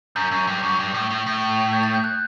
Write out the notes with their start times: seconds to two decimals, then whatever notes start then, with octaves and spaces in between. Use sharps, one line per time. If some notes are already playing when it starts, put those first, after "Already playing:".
0.16 F#2 G6
0.31 F#2
0.47 G2
0.63 F#2
0.79 G2
0.94 A2
1.10 A2
1.26 A2
1.73 G6
1.83 A6
1.94 G6
2.04 F#6